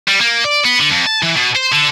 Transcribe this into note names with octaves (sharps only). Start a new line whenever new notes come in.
G3
A#3
D5
B3
D3
F2
A5
E3
B2
C5
D3